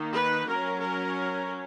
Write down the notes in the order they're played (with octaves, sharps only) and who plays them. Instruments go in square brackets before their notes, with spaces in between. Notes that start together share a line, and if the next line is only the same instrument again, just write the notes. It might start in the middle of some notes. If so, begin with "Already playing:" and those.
Already playing: [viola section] D#3 A#3 D#4
B4
F#3 C#4 A#4
A#4